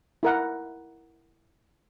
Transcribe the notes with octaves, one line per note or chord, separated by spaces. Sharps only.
E4 A#4 F#5